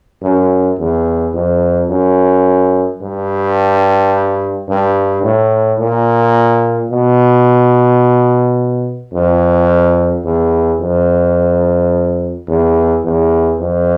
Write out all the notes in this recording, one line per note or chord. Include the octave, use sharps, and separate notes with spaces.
F#2
E2
F2
F#2
G2
G2
A2
A#2
B2
F2
E2
F2
E2
E2
F2